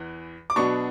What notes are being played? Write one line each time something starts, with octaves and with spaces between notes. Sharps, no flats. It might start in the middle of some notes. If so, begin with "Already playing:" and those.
Already playing: E2 E3
D6
B2 F#3 B3 D4 C#6